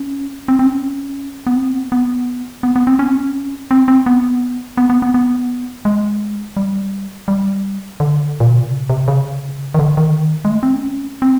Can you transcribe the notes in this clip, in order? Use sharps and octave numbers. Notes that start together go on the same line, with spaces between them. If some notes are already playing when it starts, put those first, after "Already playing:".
Already playing: C#4
C4
C4
C#4
B3
C4
B3
B3
B3
C4
C#4
C4
C#4
C4
C4
B3
B3
B3
B3
B3
G#3
G3
G3
D3
A#2
B2
C3
C#3
C3
C#3
D#3
D3
D#3
G#3
A3
C4
C#4
C4